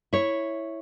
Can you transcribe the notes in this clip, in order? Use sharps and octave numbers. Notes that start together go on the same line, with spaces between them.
E4 C#5